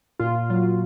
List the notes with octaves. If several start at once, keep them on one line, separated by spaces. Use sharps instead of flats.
A#2 F4
F#3 F4